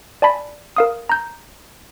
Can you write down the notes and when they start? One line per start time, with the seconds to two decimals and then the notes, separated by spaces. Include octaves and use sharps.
0.22 D5 G#5 A5 B5 B6
0.76 A#4 F5 D#6
1.09 A#5 G6